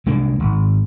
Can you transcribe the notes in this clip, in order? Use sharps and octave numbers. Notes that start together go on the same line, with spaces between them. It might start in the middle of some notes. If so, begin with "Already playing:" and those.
C2 G#3 A#3 D4
G#1